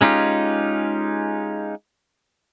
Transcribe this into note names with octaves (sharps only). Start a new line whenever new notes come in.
G#3 C#4 D#4 F4 G4